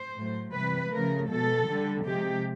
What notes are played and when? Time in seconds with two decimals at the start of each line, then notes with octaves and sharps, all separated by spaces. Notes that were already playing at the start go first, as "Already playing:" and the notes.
Already playing: C5
0.16 A2 F#3 A3
0.53 C3 E3 G3 B4
0.91 C#3 F3 A3 A#4
1.29 B2 G#3 A4
1.68 D3 G3
2.05 C3 F3 G#3 G4